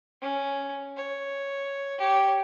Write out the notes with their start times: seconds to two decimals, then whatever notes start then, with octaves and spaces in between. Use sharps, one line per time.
0.22 C#4
0.96 C#5
1.98 G4 C#5